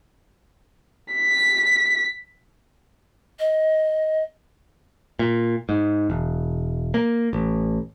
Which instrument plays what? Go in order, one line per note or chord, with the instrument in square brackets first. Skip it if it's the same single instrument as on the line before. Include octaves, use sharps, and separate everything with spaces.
[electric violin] B6
[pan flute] D#5
[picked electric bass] A#2
G#2
E1
A#3
A1